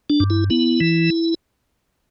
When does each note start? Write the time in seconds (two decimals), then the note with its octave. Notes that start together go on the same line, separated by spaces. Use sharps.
0.10 D4
0.20 G2
0.30 E4
0.50 B3 E4
0.81 E3